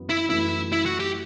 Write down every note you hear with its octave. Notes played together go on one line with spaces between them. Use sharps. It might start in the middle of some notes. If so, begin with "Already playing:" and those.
Already playing: F#2 E3 B3
E4
F#2 E3 A3 E4
E4
F#4
G4